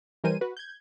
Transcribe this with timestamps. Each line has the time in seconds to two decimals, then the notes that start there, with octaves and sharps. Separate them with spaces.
0.24 E3 G3 A#4 C5 G#5 D#7
0.41 F#4 B4
0.57 G6 G#6